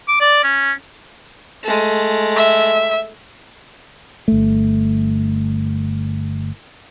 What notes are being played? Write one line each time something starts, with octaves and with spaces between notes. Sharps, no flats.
D6
D5
C#4
G#3 A3
E5
G1 A3